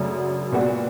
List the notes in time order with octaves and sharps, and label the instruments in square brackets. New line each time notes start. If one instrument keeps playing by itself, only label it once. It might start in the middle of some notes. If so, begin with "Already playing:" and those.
Already playing: [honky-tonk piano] F#2 C#3 F#3 A3 D4
A#2 G3 B3 D4 F#4